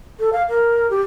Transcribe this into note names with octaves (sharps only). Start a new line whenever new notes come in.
A4
F5
A#4
G4